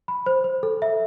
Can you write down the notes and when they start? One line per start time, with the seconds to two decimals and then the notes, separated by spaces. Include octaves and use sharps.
0.08 B5
0.26 C5
0.44 C5
0.63 A4
0.82 E5